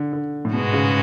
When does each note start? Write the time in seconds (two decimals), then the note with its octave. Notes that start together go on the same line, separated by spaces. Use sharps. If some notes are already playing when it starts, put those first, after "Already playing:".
Already playing: D3
0.13 D3
0.45 A2
0.53 G#2 B2 G#3 B3 F#4
0.73 C#3